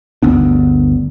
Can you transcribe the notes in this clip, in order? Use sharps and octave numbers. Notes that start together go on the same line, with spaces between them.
G1 D2 B3 D4